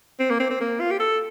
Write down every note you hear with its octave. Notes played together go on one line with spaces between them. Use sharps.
C4
A#3
C4
C4
A#3
F4
G4
A4